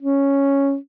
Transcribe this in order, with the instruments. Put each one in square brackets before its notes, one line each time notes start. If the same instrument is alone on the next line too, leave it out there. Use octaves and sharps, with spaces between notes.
[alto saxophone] C#4